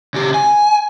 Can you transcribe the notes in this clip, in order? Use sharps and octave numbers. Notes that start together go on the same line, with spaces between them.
C#3 G4
G#5